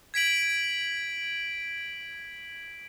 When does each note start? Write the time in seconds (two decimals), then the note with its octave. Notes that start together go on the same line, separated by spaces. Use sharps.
0.14 G#6 B6 D7 F#7